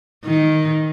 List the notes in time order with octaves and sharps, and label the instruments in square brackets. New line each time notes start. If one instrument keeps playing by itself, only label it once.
[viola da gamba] D#3